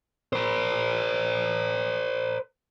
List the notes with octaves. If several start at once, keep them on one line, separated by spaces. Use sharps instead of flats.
A#4 C5